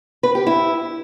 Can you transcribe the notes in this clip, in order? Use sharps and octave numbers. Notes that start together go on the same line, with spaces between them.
B4
G4
E4